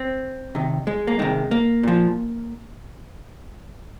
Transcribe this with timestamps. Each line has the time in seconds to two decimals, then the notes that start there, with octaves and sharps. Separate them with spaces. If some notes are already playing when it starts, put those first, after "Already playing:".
Already playing: C4
0.55 C3 D#3
0.87 G#3
1.07 A#3
1.19 C3 D#3 G#3
1.51 A#3
1.83 A#2 F3